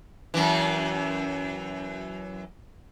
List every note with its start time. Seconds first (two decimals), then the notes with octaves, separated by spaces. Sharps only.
0.34 F#2 E3